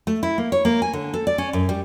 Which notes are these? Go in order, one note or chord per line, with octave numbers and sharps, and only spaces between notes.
A3
E4
A#3
C#5
A#3
G#5
D3
A4
D5
C#4
F#2
G3